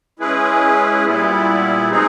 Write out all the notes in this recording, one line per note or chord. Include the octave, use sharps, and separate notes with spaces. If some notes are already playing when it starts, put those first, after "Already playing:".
G#3 C#4 E4 G#4 B4
A#2 G3 B3 E4
B2 G#3 C4 D#4 G#4